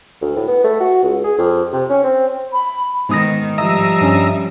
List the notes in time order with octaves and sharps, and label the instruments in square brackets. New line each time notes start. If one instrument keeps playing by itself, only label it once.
[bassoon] D2
A2
B3
A3
F#4
C#2
G#4
F2
C3
C#4
C4
[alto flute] B5
[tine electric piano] G#2 D#6 A#6 [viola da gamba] D#3 B3
[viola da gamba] F3 G3 [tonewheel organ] D#5 E5 A#5
[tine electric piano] G2 C#4